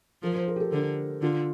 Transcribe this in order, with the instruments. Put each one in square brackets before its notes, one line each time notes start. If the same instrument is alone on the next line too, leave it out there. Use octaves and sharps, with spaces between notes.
[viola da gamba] F3 [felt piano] A#4
[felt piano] C5
A#4
G4
A4
[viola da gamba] D3 [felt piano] A#4
[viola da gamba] D3 [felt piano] F4